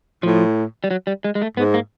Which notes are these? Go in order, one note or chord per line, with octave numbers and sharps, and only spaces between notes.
A2 F3
G3
F#3
G3
G#3
G#3
A3
G#2 B3
A#3